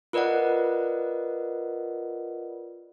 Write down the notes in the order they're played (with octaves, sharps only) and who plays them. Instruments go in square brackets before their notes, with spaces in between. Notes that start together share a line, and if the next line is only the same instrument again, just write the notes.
[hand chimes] F4 A#4 B4 D5 D#5 F#5